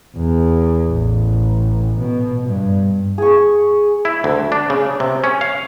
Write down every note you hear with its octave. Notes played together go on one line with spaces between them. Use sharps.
E2
A1
B2
G2
G#4 C#6
E4
D2
D4
C#3
C3
C#4
F5